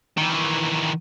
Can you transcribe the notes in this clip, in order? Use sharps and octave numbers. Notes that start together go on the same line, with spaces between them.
D#3 E3